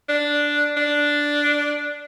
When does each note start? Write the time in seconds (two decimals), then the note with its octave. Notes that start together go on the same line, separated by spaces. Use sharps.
0.09 D4
0.77 D4